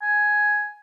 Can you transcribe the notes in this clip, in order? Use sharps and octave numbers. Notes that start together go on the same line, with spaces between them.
G#5